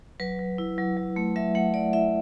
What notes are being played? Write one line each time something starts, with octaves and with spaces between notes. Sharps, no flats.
F#3 B4
F#3
E4
F#3
F#3
A3
F#3 E5
A3 F#5
F#3 D5
E4 E5